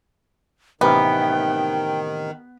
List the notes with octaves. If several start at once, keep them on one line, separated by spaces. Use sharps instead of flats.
A1 C3 D#3 B3 A#4 G5